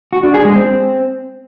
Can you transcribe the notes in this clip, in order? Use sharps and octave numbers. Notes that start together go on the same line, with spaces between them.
F#4
D4
G#4
G#3
C4